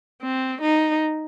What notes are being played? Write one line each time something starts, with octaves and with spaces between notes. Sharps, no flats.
C4
D#4